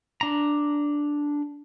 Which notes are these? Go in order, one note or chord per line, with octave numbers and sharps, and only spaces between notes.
D4 A#5